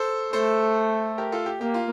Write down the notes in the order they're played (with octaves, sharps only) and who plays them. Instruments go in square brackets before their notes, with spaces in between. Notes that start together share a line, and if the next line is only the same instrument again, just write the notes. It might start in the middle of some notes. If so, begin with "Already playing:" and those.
Already playing: [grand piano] A4 C5
[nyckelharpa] A3 [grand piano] A4 C5
[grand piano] G4 A#4
F4 A4
G4
[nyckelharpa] A#3 [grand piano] G4
[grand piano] F4